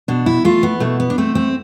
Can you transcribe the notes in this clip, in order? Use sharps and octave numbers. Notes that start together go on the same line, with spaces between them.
B2 D4
E4
A3 F4
B3
B2 A3
B3
D4
A3 C4
C4